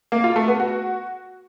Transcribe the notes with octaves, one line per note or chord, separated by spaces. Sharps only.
A#3
F4
A3
B3
F#4